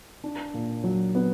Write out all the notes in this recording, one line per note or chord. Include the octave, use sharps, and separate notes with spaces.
D4
A#2
F#3
B3